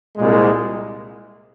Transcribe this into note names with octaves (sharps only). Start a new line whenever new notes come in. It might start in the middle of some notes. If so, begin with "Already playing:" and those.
C2 A#2 G#3